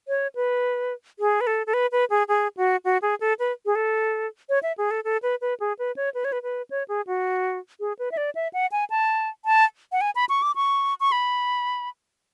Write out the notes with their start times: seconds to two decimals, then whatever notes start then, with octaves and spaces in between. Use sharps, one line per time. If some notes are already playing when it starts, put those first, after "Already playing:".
0.08 C#5
0.35 B4
1.19 G#4
1.41 B4
1.47 A4
1.67 A4
1.74 B4
1.92 B4
2.10 G#4
2.28 G#4
2.57 F#4
2.85 F#4
3.02 G#4
3.21 A4
3.39 B4
3.66 G#4
3.75 A4
4.49 C#5
4.63 E5
4.78 G#4
4.91 A4
5.04 A4
5.23 B4
5.41 B4
5.60 G#4
5.79 B4
5.97 C#5
6.14 B4
6.25 C#5
6.32 B4
6.43 B4
6.71 C#5
6.88 G#4
7.07 F#4
7.80 G#4
7.99 B4
8.12 E5
8.17 D5
8.35 E5
8.54 F#5
8.72 G#5
8.90 A5
9.45 A5
9.92 F#5
10.01 G#5
10.15 B5
10.29 C#6
10.42 D6
10.56 C#6
11.00 C#6
11.12 B5